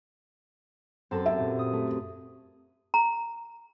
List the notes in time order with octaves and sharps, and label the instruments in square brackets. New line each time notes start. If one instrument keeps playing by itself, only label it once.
[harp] F#2 A4 A5 [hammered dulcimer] C4
[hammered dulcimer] C3 [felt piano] E5
[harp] A#2
D#6
A3
[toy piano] A#5